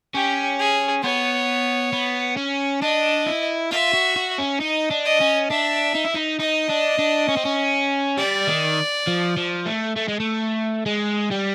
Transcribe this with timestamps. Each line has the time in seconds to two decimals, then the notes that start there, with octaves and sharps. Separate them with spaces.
0.14 C#4 G4
0.59 G#4
1.03 B3 C#5
1.93 B3
2.37 C#4
2.82 D4 D#5
3.26 E4
3.71 F4 E5
3.93 F#4
4.16 F#4
4.39 C#4
4.60 D#4 D#5
4.91 D4
5.05 D#5
5.20 C#4
5.50 D4 E5
5.95 D#4
6.04 E4
6.14 D#4
6.39 D#4 D#5
6.69 D4
6.99 D4
7.29 C#4
7.37 C4
7.45 C#4
8.18 G3 D5
8.47 D#3
9.07 F3
9.37 F3
9.66 A3
9.96 A3
10.08 G#3
10.20 A3
10.86 G#3
11.31 G3